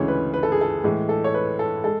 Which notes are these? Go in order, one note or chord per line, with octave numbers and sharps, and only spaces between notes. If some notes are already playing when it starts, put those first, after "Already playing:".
Already playing: D2 C#3 E3 G#3 C#5
B4
B4
A4
G#4
A4
A2 E3 G#3
A4
C#5
B4
A4
G#3 A4